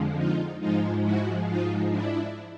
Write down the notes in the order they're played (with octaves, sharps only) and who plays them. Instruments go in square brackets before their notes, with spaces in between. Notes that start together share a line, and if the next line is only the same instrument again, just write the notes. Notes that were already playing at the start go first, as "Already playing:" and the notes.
Already playing: [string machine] F2 D3 F3 G#3
D#4 F4
G#2 F3 G#3 D#4 F4
E4 F#4
D#4 F4
D4 E4